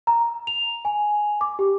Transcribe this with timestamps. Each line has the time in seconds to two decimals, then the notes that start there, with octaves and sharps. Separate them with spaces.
0.07 A#5
0.47 F7
0.85 G#5
1.41 D6
1.59 G4